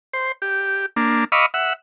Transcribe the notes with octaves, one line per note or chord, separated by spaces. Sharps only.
C5
G4
A#3 D4
D#5 F5 B5 C#6 D6 E6
E5 F#5